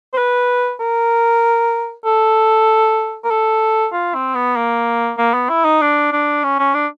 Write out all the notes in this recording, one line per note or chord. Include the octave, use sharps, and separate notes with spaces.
C5
B4
A#4
A4
A#4
A4
F4
C4
B3
A#3
A#3
B3
E4
D#4
D4
D4
C#4
C#4
D4